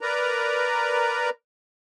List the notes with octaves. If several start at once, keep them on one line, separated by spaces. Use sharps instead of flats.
A#4 B4 D5 A#5